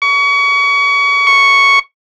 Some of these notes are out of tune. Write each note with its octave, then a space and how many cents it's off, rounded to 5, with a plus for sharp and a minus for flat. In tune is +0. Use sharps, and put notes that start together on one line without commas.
C#6 +30
C#6 +0